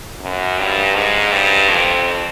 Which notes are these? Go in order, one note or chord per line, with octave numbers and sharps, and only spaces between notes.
F#2
G2
G#2
G2
F2